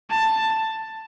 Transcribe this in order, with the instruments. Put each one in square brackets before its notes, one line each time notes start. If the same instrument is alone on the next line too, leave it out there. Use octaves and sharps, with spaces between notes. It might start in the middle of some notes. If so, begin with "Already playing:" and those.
[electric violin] A5